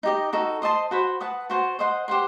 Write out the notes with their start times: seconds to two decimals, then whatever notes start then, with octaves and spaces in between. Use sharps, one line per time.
0.03 D#4 G4 D#5
0.33 D#4 F#4 A4
0.62 C5 D#5 A5 C6
0.91 F#4 C5 F#5 B5
1.20 B4 F#5 A5 D#6
1.50 F#4 C5 F#5 A5
1.79 C5 D#5 F#5 C6
2.08 G4 C5 F#5 C6